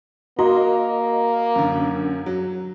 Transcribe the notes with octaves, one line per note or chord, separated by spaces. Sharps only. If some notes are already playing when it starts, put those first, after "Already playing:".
A#3 F#4 D#5 A#5 C6
F#2 D3
F#3